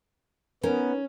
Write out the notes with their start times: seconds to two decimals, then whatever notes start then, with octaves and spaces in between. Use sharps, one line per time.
0.63 B3 C#4 D#4 A#4